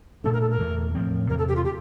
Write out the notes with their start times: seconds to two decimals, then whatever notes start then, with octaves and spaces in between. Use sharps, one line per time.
0.24 A#2 A3 D4 A4
0.33 A#4
0.41 A4
0.51 A#4
0.60 E2 E3 A3
0.95 A2 F3 C4
1.29 E2 C3 E3 A#4
1.38 A4
1.48 G4
1.56 F4
1.65 G4